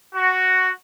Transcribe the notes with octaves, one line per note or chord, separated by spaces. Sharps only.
F#4